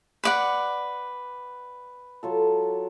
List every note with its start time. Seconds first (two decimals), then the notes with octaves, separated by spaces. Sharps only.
0.24 B4 D5 F#5
2.23 F#3 F4 A4